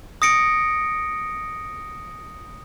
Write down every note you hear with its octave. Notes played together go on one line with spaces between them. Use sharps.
D#6 A#6 C#7 D7